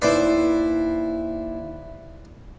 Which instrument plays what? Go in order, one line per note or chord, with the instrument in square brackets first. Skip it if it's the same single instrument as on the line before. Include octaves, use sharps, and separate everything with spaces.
[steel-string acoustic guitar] D#2 E4 [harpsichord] B4 C5 D5